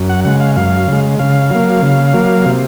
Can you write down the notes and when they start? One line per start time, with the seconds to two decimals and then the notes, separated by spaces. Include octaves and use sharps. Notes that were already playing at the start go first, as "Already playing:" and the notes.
Already playing: F#2
0.09 F#5
0.25 C#3 G#3 F#5
0.40 F5
0.56 F#2 F5
0.88 C#3 G#3
1.19 C#3 F5
1.50 F#3 A#3
1.82 C#3
2.13 F#3 A#3
2.45 C3